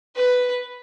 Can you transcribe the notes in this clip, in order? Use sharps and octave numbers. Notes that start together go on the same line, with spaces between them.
B4